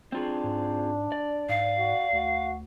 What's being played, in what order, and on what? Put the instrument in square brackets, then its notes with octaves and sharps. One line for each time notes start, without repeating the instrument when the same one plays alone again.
[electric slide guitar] C4 F4 G#4 [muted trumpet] D4
[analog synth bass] G#2
[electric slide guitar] D5
[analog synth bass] G#2 [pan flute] F5
[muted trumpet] F#4
[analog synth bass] D2 [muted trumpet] F#4